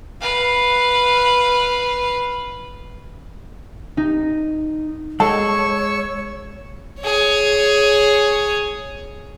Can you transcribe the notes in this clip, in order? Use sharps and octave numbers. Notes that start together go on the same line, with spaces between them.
B4 F5
D#4
G#3 A4 C#5 C#6 E6
G#4 C#5